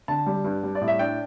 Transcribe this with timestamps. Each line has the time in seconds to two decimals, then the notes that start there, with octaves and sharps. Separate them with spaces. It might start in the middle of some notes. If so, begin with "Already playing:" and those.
0.08 D3 A5
0.26 G3
0.44 G2
0.63 G3
0.75 D5
0.81 A2
0.88 E5
0.99 D4 G5